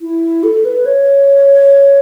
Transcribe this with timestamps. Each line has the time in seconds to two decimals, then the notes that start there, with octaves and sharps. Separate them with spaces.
0.01 E4
0.43 A4
0.65 B4
0.85 C#5